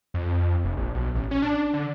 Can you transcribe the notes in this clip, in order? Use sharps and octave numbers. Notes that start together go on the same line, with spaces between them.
F2
F1
A#1
B1
A1
C#4
D4
D3